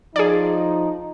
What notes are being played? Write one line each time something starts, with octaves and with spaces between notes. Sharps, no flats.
F3 D#4 G#4 D5